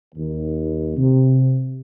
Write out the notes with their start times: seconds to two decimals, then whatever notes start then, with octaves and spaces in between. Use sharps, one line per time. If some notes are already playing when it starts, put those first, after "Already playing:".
0.15 D#2
0.96 C3